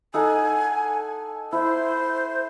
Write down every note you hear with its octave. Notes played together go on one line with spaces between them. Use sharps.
D#4 A4 F#5 G#5
E4 C5